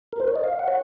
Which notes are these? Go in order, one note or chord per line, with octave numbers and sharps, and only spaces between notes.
A#4
C5
C#5
D#5
F5
F#5
C#5